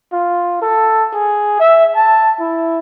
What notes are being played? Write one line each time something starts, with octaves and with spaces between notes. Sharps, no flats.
F4
A4
G#4
E5
A5
E4